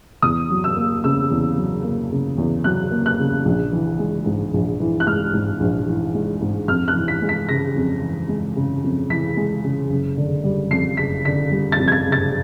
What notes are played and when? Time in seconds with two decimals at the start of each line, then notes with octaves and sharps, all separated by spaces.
0.22 E2 D#6
0.50 F#3
0.64 E6
0.76 A#3
1.04 C#3 E6
1.31 E2
1.57 F#3
1.84 A#3
2.12 C#3
2.38 E2
2.64 F#3 F#6
2.91 A#3
3.06 F#6
3.19 C#3
3.45 A#1
3.72 E3
3.99 G#3
4.26 G#2
4.54 A#1
4.80 E3
5.00 F#6
5.07 G#3 F6
5.34 G#2
5.60 A#1
5.87 E3
6.14 G#3
6.41 G#2
6.68 F2 F6
6.88 F#6
6.95 E3
7.08 B6
7.22 G#3
7.29 B6
7.49 C#3 A#6
7.76 F2
8.03 E3
8.29 G#3
8.56 C#3
8.83 F2
9.10 E3 B6
9.37 G#3
9.64 C#3
9.90 F#1
10.17 D3
10.44 G3
10.71 F2 C7
10.97 F#1 B6
11.25 D3 B6
11.51 G3
11.72 A6
11.78 F2
11.88 G#6
11.92 A6
12.06 F#1
12.12 A6